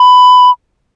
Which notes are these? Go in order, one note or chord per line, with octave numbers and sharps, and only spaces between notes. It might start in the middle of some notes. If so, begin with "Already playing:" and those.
Already playing: B5